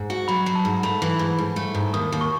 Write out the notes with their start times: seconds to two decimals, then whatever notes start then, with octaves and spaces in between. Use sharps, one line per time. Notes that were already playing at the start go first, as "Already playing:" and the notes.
Already playing: G#2
0.10 F#4
0.28 F#3 B5
0.46 F#3
0.55 A5
0.65 G#2
0.83 A3 B5
1.02 E3
1.19 G#2
1.38 G#2
1.56 A3
1.75 G#2
1.94 D#2 D#6
2.12 D#2
2.21 C#6